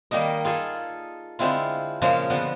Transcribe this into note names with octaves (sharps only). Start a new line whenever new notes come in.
D#3 G3 A#3 D#4 D#5
F4 G#4 A4 G#5
D3 G#3 C4 E4 F4
A#2 C#3 F3 G#3 A#3
D3 F3 B3